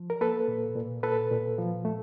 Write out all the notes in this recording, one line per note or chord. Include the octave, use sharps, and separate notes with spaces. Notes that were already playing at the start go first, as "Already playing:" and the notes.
Already playing: F3
A#4
A#3 A4 B4
A#2
A#2
A#2 A4 B4
A#2
F3
A3